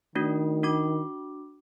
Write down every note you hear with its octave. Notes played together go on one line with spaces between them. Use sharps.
D#3 A3 D4 F#4
D4 F#4 D6